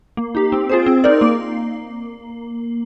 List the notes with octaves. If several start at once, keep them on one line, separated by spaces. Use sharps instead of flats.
A#3
D#4 G4
C4
F4 G#4 C5
C4
D#4 A#4 D5
A#3